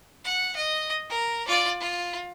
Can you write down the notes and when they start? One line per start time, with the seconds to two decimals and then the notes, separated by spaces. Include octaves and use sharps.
0.25 F#5
0.56 D#5
1.10 A#4
1.47 F4 D5
1.80 F4